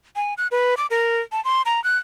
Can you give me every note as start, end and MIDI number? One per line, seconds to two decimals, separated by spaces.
0.16 0.34 80
0.38 0.47 90
0.51 0.75 71
0.77 0.87 86
0.90 1.21 70
1.32 1.43 81
1.45 1.62 84
1.66 1.82 82
1.84 1.97 90